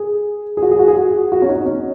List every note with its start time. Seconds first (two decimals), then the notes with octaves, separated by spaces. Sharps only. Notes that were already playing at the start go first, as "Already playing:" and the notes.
Already playing: G#4
0.57 G#4
0.62 F#4
0.71 G#4
0.79 F#4
0.88 G#4
0.97 F#4
1.32 F#4
1.42 C#4
1.49 D#4
1.66 C#4